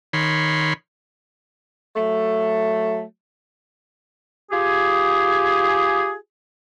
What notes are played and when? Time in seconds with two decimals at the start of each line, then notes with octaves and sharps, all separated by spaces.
0.13 D#3 C#5 B5 C6
1.96 F#3 A3
4.50 F4 G4 G#4